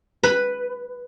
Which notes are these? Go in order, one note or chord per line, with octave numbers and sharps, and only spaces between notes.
B4